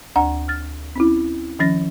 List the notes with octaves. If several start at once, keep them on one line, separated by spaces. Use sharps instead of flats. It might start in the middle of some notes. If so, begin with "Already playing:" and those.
D2 D4 F#5 A#5
F6 A6
C4 C#4 E4
D#3 F3 C#4 A6 A#6